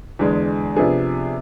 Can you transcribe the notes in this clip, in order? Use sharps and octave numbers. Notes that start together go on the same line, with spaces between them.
E2 D3 G#3
C3 F3 B3 D4 G#4